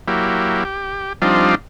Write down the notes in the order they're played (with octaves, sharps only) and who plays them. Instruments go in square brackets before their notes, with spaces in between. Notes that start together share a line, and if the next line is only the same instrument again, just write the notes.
[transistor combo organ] F#3 A#3 E4 G4
G4
F3 G3 C4 D4 D#4 F4